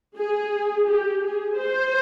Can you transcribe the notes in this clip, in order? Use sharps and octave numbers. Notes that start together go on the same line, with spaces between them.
G#4
G4
G#4
C5